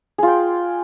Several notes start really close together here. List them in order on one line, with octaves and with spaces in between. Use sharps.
G#4 F4 G5